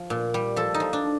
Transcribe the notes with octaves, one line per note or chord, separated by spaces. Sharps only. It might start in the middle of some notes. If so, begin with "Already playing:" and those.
Already playing: F3
A#2
G3
F3 A4
D#4
F3
D4